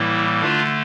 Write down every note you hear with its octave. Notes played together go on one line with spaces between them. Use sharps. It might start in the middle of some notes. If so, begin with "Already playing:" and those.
Already playing: A2 E3 G3 A#3 E4
D3 A3 D4 F4